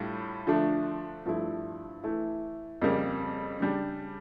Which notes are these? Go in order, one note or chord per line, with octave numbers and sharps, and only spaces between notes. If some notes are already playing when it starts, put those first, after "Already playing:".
Already playing: A2 G3 D4 F4
D3 F3 A3 D4
G2 F3 A3 E4
E3 A3 E4
F2 C#3 G3 A#3
C#3 G3 D4